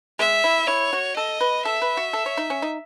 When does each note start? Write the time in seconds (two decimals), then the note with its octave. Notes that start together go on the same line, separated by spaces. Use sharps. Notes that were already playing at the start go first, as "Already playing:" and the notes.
0.19 G#3 E5
0.44 E4
0.68 E4 C#5
0.93 F#4
1.16 A4 D#5
1.41 B4
1.65 A4 E5
1.82 B4
1.97 F#4
2.13 A4
2.26 C#5
2.37 D#4
2.50 C#4
2.62 D#4